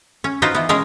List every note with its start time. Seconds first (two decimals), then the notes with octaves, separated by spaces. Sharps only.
0.24 C#4
0.42 D#4 F4 F#4 B4 C5
0.54 E3 B3
0.69 B2 G#3 C#4 G#4 A#4 G#5